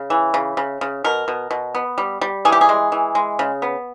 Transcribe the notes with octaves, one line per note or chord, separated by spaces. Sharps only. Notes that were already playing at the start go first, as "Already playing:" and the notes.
Already playing: C#3
E3
C#3
C#3
C#3
B2 A#4
B2
B2
B3
G3
G3
E3 G#4
G4
G#4
G#3
E3
G#3
C#3
B3